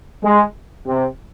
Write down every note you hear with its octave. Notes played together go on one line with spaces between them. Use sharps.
G#3
C3